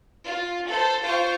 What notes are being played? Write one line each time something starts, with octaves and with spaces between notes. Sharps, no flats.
F4
A4 C5
F4 C5 G5 C#6